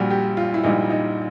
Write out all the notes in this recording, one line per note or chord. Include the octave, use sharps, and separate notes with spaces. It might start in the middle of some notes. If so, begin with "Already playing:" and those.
Already playing: A#1 A#2 G3 F#4
G4
F4
E4
A#1 A#2 G3 D#4
D#4